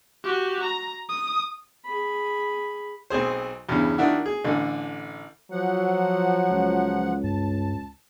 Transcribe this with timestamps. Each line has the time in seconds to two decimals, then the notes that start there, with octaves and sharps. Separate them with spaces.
0.24 F#4 G4
0.64 A#5
1.09 D#6
1.85 G#4 B5
3.10 B1 C4 G#4 C5
3.69 E2 G2 C#3
3.98 D#3 D4 E4 F#4
4.26 G#4
4.44 A1 D3
5.51 F3 F#3 F#5
6.50 C#2
7.24 G2 A5